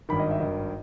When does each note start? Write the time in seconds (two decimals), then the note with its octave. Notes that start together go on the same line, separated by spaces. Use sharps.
0.09 G#1 G2 D#3 B5
0.20 D#5
0.31 E5
0.40 G#1 G2 D#3 D#5